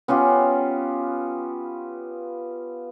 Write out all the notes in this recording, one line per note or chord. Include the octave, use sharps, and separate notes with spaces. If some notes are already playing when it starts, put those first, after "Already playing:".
B3 C#4 F4 G4